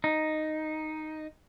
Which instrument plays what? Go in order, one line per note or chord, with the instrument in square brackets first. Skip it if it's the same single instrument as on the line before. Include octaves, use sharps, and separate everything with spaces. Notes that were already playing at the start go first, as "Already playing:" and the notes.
[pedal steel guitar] D#4